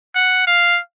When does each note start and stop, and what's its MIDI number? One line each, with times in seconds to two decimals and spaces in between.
0.15 0.43 78
0.47 0.80 77